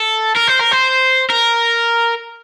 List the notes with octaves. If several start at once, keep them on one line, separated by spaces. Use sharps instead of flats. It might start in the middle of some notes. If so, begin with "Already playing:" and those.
Already playing: A4
A#4
C5
A#4
C5
A#4